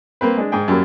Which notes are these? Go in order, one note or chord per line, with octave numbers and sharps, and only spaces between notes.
A#3 C4 B4
G#3 D4
G#2 G#4 G5
F#2 F#3 G3 A#3